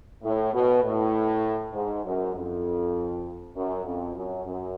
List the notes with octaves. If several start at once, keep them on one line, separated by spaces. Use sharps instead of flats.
A2
B2
A2
G#2
F#2
F2
F#2
F2
F#2
F#2